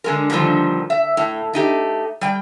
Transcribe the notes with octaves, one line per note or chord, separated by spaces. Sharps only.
D3 G#3 A#4
G2 A#2 D3 D#3 F3
E5
A2
A3 D#4 G4
G3 G5